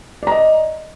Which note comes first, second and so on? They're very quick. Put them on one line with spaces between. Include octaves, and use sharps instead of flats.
D5 A#5 D#5